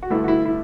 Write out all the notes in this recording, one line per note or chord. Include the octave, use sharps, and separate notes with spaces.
F#4
G2 D3 A3 E4
F#4
E4
E4